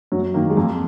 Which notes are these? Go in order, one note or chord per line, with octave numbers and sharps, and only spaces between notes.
F#2 F#3
D#3 A#3
G#3
F2 A#3